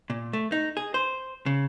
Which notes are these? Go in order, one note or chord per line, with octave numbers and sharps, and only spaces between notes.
A#2
A3
D#4
G#4
C5
C#3